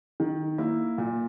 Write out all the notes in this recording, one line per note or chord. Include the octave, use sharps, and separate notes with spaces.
D#3
A#3 E4
A#2